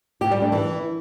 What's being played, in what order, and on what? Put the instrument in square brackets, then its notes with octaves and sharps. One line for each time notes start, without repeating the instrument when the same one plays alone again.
[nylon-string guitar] G4
G3
D4
E3